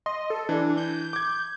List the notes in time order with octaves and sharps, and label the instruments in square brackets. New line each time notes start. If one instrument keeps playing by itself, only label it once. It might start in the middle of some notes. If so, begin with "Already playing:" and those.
[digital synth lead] D#5 [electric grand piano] C6
[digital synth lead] A4
[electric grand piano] E3 [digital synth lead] D4
[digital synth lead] G6
[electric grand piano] D6 G#6